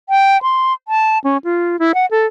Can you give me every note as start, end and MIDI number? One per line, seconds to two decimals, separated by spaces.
0.09 0.41 79
0.43 0.73 84
0.88 1.18 81
1.24 1.37 61
1.44 1.79 65
1.79 1.92 64
1.94 2.06 78
2.11 2.26 69